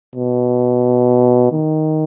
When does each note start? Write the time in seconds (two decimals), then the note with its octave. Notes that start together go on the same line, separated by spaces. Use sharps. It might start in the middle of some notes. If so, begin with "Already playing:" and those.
0.16 B2
1.52 D#3